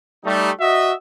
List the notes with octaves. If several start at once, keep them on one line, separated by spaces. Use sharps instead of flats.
G3 A3 D#4
F#4 D#5 E5